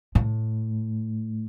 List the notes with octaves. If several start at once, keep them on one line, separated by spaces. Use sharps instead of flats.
A2